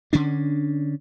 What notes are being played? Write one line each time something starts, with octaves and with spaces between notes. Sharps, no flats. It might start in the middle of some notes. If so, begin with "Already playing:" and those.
D3 C#4 D4